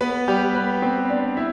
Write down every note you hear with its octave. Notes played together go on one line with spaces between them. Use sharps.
B3 B4
G3 G4
B3 B4
C4 C5
D4 D5
E4 E5